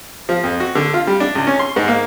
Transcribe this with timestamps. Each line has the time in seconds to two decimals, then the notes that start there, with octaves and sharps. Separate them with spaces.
0.29 F3
0.44 F2
0.60 F#4
0.75 D3
0.94 F4
1.07 G3
1.20 D4
1.35 C#2
1.47 C#4
1.59 C6
1.76 G#2
1.88 A#3